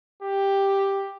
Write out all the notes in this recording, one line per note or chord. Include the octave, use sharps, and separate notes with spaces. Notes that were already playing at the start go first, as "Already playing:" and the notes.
G4